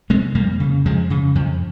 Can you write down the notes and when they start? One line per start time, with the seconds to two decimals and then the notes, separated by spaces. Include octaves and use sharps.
0.10 C3 G#3 C4
0.35 F2 G3 A#3
0.60 C#3
0.85 F2 F3 G#3
1.10 C#3
1.35 F2 F3